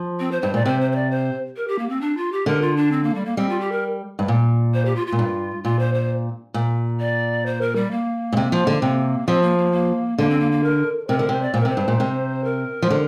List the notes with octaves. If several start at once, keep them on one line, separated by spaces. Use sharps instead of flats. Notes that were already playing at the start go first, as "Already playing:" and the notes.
Already playing: F3
C4
C5
G2 C5
A#2 D5
C3 C5
C5
C5
D5
C5
A#4
G4
A#3
C4
D4
F4
G4
D3 A#4
F4
D4
C4
A#3
G3
A#3
G3 C4
F4
G4
A#4
G2
A#2
C5
G4
F4
F4
A#2
G2
A#2 F4
C5
C5
A#2
D5
C5
A#4
G3
A#3
A#2
C3
F3
D3
C3 A#3
F3 C4
A#3
A#3
A#3
D3 A#3
C4
A#3
A#3
A#4
C3 A#4
D3 A#4
C3 C5
D5
A#2 C5
A#4
C3
C5
G2
A#2
C3
A#4
F3
D3